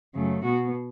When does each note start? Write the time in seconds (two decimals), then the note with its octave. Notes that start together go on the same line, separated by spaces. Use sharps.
0.14 F#2 C#3 A3
0.43 B2 B3 F#4